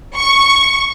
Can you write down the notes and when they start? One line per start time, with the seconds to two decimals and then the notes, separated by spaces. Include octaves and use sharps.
0.16 C#6